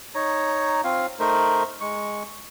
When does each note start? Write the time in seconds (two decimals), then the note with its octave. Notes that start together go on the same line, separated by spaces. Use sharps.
0.15 D#4 C#5 A#5
0.84 C4 F4 F5
1.20 A3 D#4 A#4 C5
1.81 G#3 C#6